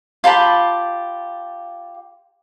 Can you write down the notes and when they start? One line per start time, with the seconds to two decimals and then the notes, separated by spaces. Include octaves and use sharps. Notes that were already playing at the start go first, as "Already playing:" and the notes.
0.24 F4 G4 A5 B5